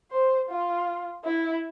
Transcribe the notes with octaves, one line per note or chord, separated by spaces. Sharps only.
C5
F4
E4